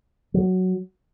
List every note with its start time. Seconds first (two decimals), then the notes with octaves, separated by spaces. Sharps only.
0.34 F#3